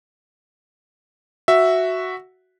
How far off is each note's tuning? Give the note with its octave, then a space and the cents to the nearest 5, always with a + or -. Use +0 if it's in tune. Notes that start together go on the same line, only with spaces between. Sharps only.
F#4 +0 E5 +0